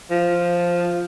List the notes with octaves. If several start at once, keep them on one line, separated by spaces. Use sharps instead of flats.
F3